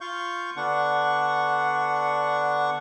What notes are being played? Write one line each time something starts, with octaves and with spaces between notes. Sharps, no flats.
F4 F5 C#6 G6
D3 B3 D4 F#5 C#6